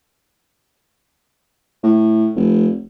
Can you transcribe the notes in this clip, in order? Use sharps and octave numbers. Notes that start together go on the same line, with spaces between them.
A2
F1